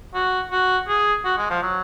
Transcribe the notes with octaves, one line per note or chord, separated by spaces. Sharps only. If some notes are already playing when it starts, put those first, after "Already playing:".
F#4
F#4
G#4
F#4
G#3
F3
F#3